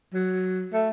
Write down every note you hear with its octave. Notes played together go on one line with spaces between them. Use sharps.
F#3
A3